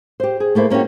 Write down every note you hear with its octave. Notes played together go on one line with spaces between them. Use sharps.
G4 C5
G#4
A3 A#3 E4 C5
A#3 C#4 D#4 F#4 G4